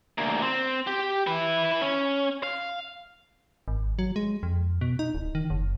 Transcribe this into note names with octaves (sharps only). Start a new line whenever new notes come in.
D2 A#3
C4
G4
E4 B4
C#4
F5
G#1
F#3
G#3
F2
B2
D#4
D1
D#3
F#1